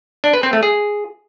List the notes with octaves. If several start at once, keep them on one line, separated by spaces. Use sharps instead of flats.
D4
B4
C4
A3
G#4